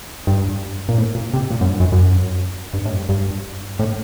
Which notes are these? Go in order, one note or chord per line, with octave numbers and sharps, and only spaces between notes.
G2
A#2
A2
A#2
C3
A#2
F#2
G2
F#2
F#2
G2
A2
F#2
G2
G2
A2